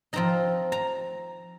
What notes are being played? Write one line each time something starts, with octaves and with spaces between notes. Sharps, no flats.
F3 C4 D#4 A#5
A#5